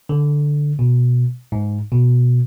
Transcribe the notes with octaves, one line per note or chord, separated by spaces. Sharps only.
D3
B2
G#2
B2